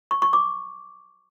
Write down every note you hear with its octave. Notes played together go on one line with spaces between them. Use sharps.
C#6
C#6
D6